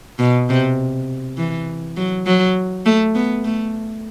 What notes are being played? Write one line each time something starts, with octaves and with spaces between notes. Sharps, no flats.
B2
C3
E3
F#3
F#3
A3
B3
A3